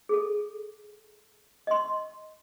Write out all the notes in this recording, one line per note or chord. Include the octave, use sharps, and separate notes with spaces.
G#4 A4
D#5 C6